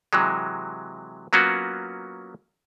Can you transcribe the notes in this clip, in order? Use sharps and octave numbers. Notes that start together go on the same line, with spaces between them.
C3 E3 F#3 G#3
F#3 A#3 B3 C#4 F4 F#4